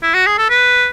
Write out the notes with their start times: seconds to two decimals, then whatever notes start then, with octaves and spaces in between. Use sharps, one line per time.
0.02 E4
0.14 F#4
0.27 G#4
0.38 A4
0.50 B4